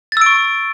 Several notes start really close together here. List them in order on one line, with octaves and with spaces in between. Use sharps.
A6 E6 D7 C#6